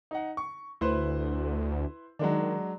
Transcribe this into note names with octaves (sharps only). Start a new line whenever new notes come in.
D#4 F#5
C#6
D2 E4 B4 C5
D#3 F#3 G#3 D4